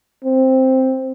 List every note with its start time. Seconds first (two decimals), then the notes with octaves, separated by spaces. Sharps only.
0.24 C4